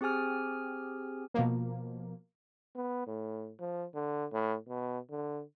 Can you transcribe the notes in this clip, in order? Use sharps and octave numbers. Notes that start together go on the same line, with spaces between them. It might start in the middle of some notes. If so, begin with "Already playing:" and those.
C4 G4 G#4 G#5 F6
B2 F3 A#3
B3
A2
F3
D3
A2
B2
D3